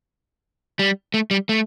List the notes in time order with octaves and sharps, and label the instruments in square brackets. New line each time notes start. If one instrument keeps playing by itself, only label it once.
[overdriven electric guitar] G3
A3
G3
A3